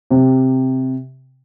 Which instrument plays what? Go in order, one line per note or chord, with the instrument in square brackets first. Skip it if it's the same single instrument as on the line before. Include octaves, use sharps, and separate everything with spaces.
[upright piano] C3